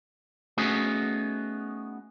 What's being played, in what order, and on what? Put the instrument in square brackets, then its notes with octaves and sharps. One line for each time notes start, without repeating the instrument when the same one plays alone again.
[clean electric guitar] A3 B3 C#4 D#4 F#4 G#4